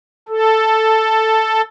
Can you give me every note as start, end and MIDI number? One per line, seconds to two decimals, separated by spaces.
0.28 1.61 69